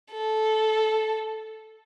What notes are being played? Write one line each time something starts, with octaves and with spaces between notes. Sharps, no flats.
A4